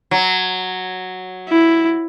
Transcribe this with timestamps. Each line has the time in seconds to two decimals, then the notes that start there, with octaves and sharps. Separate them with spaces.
0.11 F#3
1.48 E4